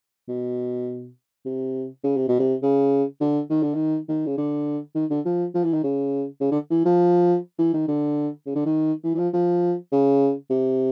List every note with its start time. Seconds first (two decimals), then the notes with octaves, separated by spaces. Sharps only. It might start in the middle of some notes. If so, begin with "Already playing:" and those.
0.29 B2
1.46 C3
2.04 C#3
2.16 C3
2.29 B2
2.39 C3
2.63 C#3
3.21 D3
3.50 D#3
3.62 D3
3.75 D#3
4.09 D#3
4.27 C#3
4.38 D3
4.95 D#3
5.10 D3
5.25 F3
5.55 F3
5.64 E3
5.73 D#3
5.84 C#3
6.41 C#3
6.52 D3
6.71 E3
6.85 F3
7.59 E3
7.73 D#3
7.88 D3
8.46 C#3
8.55 D3
8.66 D#3
9.04 E3
9.15 E3
9.18 F3
9.34 F3
9.92 C#3
10.50 C3